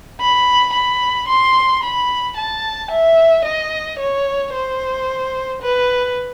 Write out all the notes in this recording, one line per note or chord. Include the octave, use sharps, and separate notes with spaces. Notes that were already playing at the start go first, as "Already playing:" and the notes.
B5
B5
C6
B5
A5
E5
D#5
C#5
C5
B4